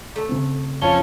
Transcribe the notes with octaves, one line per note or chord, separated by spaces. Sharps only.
A3
C#3 C4
F2 C#4 F5 A5 G7